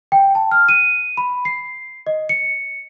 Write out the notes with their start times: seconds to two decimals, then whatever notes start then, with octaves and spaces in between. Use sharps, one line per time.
0.12 G5
0.35 A5
0.51 F6
0.69 D#7
1.17 B5
1.45 C7
2.07 D#5
2.29 C#7